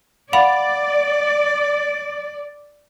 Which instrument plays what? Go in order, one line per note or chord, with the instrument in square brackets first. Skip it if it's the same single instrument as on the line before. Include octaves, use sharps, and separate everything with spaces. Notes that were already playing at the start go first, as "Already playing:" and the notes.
[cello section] D5 [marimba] F5 F#5 B5